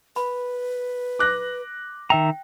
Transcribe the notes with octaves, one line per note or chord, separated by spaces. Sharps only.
B4 B5
D6 F#6 A#6
D#3 E5 G5 A#5